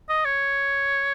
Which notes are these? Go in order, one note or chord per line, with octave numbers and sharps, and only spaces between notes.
D#5
C#5